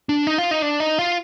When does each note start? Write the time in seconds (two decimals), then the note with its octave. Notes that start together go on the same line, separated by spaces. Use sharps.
0.09 D4
0.27 D#4
0.38 F4
0.51 D#4
0.62 D4
0.80 D#4
0.99 F4